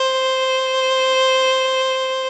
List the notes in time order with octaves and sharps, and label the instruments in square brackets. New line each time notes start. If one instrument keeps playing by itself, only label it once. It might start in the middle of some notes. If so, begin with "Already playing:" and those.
Already playing: [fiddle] C5